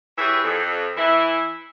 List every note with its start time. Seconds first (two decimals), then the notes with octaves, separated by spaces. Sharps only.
0.18 E3 G4 G#4 B4 C#5 E5
0.44 F2
0.97 E3 E4